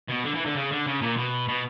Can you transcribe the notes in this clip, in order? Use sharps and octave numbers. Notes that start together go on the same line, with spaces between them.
B2
D3
E3
D3
C#3
D3
C#3
A#2
B2
B2